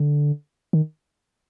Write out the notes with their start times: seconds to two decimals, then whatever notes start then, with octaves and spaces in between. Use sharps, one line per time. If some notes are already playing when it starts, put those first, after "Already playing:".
Already playing: D3
0.73 D#3